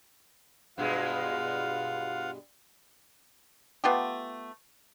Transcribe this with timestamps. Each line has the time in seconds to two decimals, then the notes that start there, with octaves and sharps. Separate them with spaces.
0.78 G2 B2 G#3 F4 F5 F#5
3.84 A3 B3 F4 G4